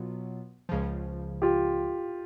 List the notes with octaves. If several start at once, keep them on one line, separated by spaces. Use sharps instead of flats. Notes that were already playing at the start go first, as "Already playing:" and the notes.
Already playing: B2 F#3 B3 F4
C#2 C#3 F3
F4 G4